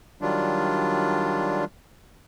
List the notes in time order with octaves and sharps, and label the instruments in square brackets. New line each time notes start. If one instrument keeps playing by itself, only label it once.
[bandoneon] D#3 F#3 G3 D4 F4